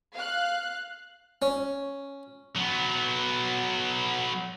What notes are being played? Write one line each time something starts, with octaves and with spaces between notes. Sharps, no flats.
F5 F#6
C#4
F#3 B3